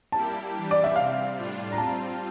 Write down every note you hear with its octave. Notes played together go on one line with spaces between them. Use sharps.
G3 A#3 E4 G4 A5
E3 G3 D4 G4
D5
E5
C3 G3 C4 F5
A2 G3 D4 F4
A#5
G3 C4 F4 A5